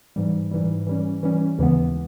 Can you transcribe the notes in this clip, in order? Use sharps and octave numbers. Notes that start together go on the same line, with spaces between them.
G#2 E3 G3
G#2 E3 G3
E3 G3 C#4
E3 G3 C#4
D#2 C#3 E3 G#3 B3